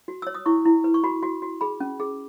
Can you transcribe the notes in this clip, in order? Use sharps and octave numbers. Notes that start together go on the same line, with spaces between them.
F#4
C#5 E6
D#6
E4 C#6
E4
B4
C#6
F#4 B5
F#4
F#4
G#4 B5
C#4
G#4